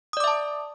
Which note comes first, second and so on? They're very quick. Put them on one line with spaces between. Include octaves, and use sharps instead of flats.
D#6 D5 D6 E5 A5